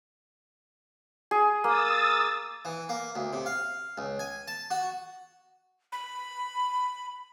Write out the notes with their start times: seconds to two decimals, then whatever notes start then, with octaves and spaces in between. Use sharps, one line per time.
1.31 G#4
1.64 A#3 D#6 E6 A6
2.65 E3
2.89 A#3
3.15 D2
3.33 C3
3.46 F5
3.98 C#2
4.19 G#5
4.48 A5
4.71 F#4
5.92 B5